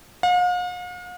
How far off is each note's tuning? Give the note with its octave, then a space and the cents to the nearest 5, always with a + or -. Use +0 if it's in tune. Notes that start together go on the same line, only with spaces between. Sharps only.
F5 +45